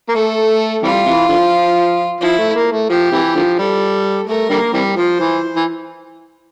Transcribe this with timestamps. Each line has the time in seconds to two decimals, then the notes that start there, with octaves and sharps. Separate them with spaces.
0.09 A#3
0.14 A3 A4
0.83 C3 E3 G3 F4
1.06 C3 E3
1.29 D3 F3
2.21 F3 E4
2.38 A3
2.55 A#3
2.72 A3
2.89 F3 G4
3.12 C3 E3
3.35 D3 F3
3.59 G3 A4
4.27 A3 A#4
4.50 D3 G3 A#3
4.73 C3 E3 G3
4.96 F3 C5
5.20 E3
5.56 E3